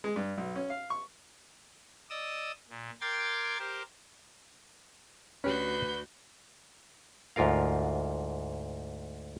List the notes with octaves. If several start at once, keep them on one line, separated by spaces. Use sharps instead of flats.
G#3
G2
B1
C#4
F5
C#6
D5 D#5 D#6 E6
A#2
A#4 G5 C6 D6 G#6 A6
G4 A#4 C5
D2 C#4 F#4 G4 B4 G6
D2 G#2 F4 A#4 F5